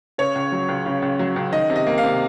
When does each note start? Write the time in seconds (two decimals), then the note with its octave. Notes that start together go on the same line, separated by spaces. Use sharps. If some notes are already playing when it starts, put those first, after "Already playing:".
0.18 C#3 C#5
0.35 C#2
0.52 F#3
0.68 C#2
0.86 C#3
1.02 C#2
1.19 F#3
1.36 C#2
1.53 D#3 D#5
1.70 C3
1.76 D#5
1.87 A#3
1.98 F5
2.04 C3